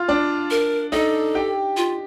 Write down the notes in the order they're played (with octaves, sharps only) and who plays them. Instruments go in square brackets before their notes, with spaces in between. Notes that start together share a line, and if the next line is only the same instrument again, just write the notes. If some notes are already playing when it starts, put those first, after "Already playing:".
Already playing: [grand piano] F4 F5
D4 D5
[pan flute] A#4
[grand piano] D#4 D#5 [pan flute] A4
[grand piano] G4 G5
[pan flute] F4